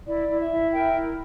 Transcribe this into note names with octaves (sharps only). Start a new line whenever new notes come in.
E4 D5
E4
E5
E4
A#4 E5 G5
E4